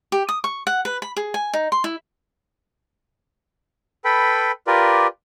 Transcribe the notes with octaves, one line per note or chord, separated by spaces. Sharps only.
G4
D#6
C#6
F#5
B4
B5
G#4
G#5
D#4
C6
E4
A4 B4 G5 B5
F4 G4 A#4 B4 D5